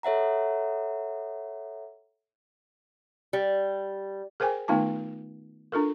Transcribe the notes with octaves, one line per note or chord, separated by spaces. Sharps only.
A4 C#5 E5 F#5 A#5
G3
G#4 A#4 C5 G5 G#5
D#3 A3 B3 D#4 F4 A5
D4 F4 A4 A#4